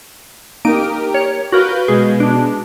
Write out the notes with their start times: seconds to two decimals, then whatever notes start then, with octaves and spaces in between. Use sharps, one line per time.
0.65 A#3 D#4 G4 A#4 D7
1.14 C#5
1.52 F#4 A#4 B4 F5 G6
1.88 B2 G#3 G#4
2.20 D4